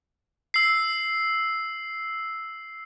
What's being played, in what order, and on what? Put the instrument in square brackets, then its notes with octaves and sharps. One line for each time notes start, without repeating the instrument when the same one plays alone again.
[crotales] E6 C7